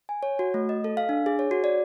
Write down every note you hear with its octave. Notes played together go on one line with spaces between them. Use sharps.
G#5
C#5
F#4
A3
D#5
A4
F5
D4
G#4
C#5
F#4
D5